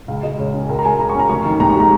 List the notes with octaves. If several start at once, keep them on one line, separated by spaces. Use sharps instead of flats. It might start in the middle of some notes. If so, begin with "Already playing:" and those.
C#2 F5
G#3 D#5
C#3 C#5
C#4
G#4
C#2 A#4
A#5
G#3 G#5
C#3 A#5
C#6
C#4 A#5
F1 C#6
D#3
D#2 A#5
C#6
G#3 A#5